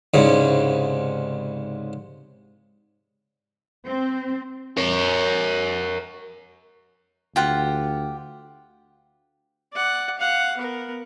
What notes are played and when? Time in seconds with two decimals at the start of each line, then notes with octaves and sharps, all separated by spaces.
0.14 C2 G#2 C#3
3.86 C4
4.77 A#4 C#5
7.36 D2 F4 G4 F#5
9.74 D5 F#5
10.19 F5 F#5
10.57 B3 A#4